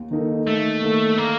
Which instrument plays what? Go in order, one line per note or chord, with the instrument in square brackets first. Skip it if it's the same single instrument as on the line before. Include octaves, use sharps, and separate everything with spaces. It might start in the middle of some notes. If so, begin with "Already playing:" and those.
Already playing: [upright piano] D#2
D#3 A#3 D#4 A4
[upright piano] D#2 [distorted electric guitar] A3
[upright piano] D#3 A#3 D#4 A4
[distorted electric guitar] A#3